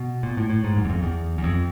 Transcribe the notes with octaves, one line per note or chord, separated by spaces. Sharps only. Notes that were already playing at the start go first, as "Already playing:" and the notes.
Already playing: B2
A#2
A2
A2
G#2
F#2
E2
F2
E2
E2
F2